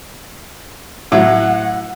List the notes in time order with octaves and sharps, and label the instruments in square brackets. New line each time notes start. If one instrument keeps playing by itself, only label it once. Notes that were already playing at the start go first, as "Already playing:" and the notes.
[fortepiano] A2 F#3 [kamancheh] F#5